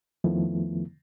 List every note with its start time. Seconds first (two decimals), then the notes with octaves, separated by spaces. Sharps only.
0.24 F2 D#3 F3 A3 B3 E4